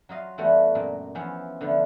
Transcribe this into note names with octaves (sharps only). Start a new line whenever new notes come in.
F#3 F4 D#5 F5
E3 G3 A3 B3 F#4
F#2 A#2
E3 F3 B3 C#4 E4 C5
D3 F3 A3 B3